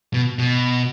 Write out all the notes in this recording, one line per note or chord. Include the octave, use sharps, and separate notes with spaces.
B2
B2